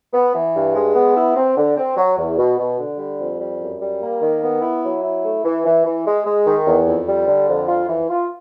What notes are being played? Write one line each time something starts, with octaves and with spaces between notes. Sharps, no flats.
B3
E3
G2
G#3
B3
E4
C4
D3
C4
F#3
E2
B2
B2
D3
G3
F2
G3
F#2
G3
A#3
D#3
B3
E4
F#3
E4
A3
E3
E3
E3
G#3
G#3
D#3
E2
F2
G3
D3
F2
F4
E3
F4